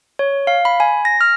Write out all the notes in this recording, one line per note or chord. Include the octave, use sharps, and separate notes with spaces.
C#5
F5
B5
G#5
A#6
F6